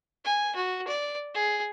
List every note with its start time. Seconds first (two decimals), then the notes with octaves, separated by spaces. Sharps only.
0.25 G#5
0.55 F#4
0.87 D5
1.34 G#4